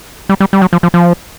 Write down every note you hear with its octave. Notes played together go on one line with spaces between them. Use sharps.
G3
G3
G3
F#3
F3
F3
F3